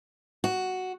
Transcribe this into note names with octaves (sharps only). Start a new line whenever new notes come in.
F#4